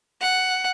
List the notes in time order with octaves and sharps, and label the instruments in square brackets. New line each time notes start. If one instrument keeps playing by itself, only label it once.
[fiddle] F#5